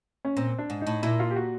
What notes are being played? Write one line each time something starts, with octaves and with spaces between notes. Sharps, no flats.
C#4
A#2 C4
D4
G#2
D#4
A2
A#2 E4
F4
G4
F#4